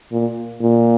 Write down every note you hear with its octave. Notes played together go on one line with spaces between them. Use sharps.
A#2
A#2